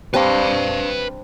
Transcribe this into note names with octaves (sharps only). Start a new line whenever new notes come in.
G3 C4 D4 B4 F5